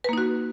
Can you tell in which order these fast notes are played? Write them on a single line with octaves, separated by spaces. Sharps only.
B4 A#3 D#4 F#4